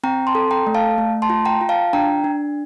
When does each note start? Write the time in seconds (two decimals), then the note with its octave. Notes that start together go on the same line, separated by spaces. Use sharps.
0.04 C4 G5 A#5
0.27 A5 C6
0.35 A4
0.51 G5 A#5
0.67 A3
0.75 F5 A5
0.98 A3
1.22 A5 C6
1.30 F4
1.45 G5 A#5
1.61 F4
1.69 F5 A5
1.93 D4 G5 A#5
2.24 D4